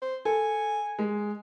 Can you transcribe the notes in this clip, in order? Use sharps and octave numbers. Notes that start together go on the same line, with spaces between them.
C5
A4 G#5
G#3